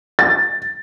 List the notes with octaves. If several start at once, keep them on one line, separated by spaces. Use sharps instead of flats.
A6